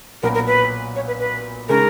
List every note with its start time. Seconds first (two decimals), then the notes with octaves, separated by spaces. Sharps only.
0.23 B1 A#2 F#3 B3 A#4
0.34 A#4
0.47 B4
0.96 C#5
1.07 B4
1.19 B4
1.69 C#3 G#3 D#4 A#4